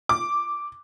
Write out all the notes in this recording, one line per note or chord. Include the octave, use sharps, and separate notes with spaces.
D6